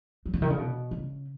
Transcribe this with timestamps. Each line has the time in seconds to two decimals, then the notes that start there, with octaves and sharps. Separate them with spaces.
0.26 F#3
0.34 C#3
0.42 D#3
0.50 C#3
0.58 B2
0.91 C#3